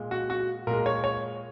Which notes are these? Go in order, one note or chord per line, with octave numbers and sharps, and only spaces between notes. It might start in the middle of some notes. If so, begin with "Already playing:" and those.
Already playing: A#2 G#3
F#4
F#4
A#2 G#3 A#4
C#5
C#5